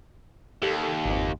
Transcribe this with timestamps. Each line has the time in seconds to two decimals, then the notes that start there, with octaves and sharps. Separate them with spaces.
0.62 D#2 G4 A4
1.05 G#1 F2